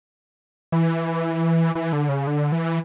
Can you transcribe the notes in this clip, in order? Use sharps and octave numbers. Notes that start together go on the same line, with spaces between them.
E3
E3
D3
C#3
D3
E3